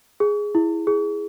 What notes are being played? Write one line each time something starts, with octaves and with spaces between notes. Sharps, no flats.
G#4
E4
G#4